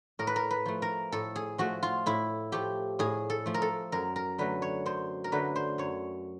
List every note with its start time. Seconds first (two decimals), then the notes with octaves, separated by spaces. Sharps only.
0.19 A2 A#4
0.27 B4
0.36 A#4
0.51 B4
0.66 F3 A3
0.82 A#4
1.12 A2 A4
1.36 G#4
1.58 F3 A3 F#4
1.83 F4
2.06 A2 E4
2.52 F3 A3 G4
2.99 A2 G#4
3.30 A4
3.46 F3 A3
3.54 A#4
3.62 A4
3.92 F#2 A#4
4.16 A#4
4.38 D3 F#3 A3 B4
4.62 C#5
4.86 F#2 C5
5.24 A#4
5.32 D3 F#3 A3 B4
5.56 C5
5.78 F#2 C#5